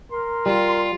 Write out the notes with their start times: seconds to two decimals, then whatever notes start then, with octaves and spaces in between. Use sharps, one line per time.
0.12 A#4 C6
0.46 G3 F4